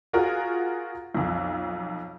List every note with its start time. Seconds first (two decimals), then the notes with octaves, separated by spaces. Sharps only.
0.13 F4 F#4 G#4 A#4
1.15 B1 F2